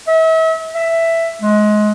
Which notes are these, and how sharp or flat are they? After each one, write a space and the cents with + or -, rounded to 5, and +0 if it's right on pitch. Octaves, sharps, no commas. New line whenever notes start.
E5 -40
E5 +5
G#3 +25